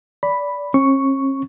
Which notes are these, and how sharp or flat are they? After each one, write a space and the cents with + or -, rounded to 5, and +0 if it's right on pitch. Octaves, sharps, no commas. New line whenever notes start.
D5 -20 B5 +0
C#4 -45 C#6 +0